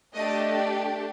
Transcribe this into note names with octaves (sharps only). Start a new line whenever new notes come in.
A3 D4 G4 D#5